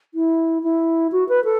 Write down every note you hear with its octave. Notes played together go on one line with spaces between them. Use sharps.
E4
E4
F#4
B4
A4